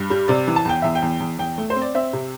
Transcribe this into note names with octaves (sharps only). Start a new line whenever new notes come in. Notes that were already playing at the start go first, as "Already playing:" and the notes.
Already playing: G2
G3
C3 D5
E3
A5
E2 G5
E2 E5
G5
E2
E2
E2 G5
A3
C5
C4
D5
C4 E5
C3